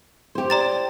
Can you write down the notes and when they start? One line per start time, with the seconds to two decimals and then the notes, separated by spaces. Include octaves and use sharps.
0.35 G4 C5
0.50 D5 A#5 A6